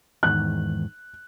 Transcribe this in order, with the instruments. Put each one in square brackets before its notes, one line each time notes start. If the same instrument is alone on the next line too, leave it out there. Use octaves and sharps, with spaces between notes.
[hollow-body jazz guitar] E2 G#2 D#3 [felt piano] F#6